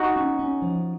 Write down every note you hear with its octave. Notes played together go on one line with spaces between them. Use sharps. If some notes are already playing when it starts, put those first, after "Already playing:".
Already playing: D#4 F#4
C#4
C#4
F3